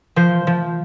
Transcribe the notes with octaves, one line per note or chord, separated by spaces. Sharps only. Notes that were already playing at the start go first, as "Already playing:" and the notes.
F3 C5
F3